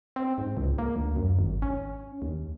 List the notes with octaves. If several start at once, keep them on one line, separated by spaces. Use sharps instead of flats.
C4
G#2
C#2
A#3
D2
F#2
G#1
C#4
D#2